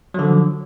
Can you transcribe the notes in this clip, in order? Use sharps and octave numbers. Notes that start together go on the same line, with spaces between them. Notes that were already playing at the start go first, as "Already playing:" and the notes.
D3 F3 F#3